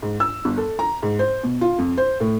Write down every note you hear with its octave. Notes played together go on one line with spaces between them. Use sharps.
G#2
E6
G1
A4
A#5
G#2
C5
B2
F4
F2
C5
A2